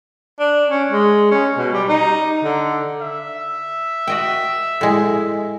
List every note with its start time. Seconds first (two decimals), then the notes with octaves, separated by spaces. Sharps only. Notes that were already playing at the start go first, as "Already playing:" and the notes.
0.39 D4
0.70 C#4
0.91 G#3
1.31 C#4
1.58 B2
1.74 G3
1.89 D#4
2.44 D3
3.02 E5
4.07 F#4 D#5 G5
4.81 A2 G#3